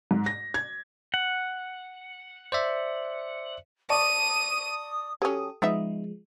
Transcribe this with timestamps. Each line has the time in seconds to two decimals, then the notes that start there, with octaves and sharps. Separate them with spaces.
0.11 G#2
0.26 A#6
0.54 G#6
1.14 F#5
2.52 C5 D5 E5
3.90 D5 A5 C#6 D#6 D#7
5.22 F#3 C#4 G4 A4 D#6
5.62 F3 G#3 B3 D#4 E5